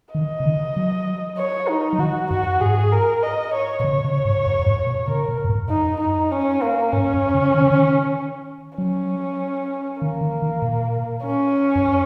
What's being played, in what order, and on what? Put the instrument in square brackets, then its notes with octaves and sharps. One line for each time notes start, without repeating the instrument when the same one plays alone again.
[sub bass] D#3 [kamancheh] D#5
[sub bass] C#3
D#3
F#3
[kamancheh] C#5
D#4
[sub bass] F#3
[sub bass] D#3 [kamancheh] F#4
[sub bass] F#2 [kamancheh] F#4
[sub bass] G#2 [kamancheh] G#4
[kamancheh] A#4
D#5
C#5
[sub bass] A#2
[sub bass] C#3 [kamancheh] C#5
[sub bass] C#3
G#2
F#2
F#2
G#2
A#2
[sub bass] C#3 [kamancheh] A#4
[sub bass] A#2
F#2
G#2
[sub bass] F#2 [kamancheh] D#4
[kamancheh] D#4
C#4
A#3
[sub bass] G#2 [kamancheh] C#4
[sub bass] F#2
C#3
D#3
C#3
D#3
[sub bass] F#3 [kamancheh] C#4
[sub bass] D#3 [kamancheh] A#3
[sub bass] D#3
D#3
A#2
[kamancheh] C#4
[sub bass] F#2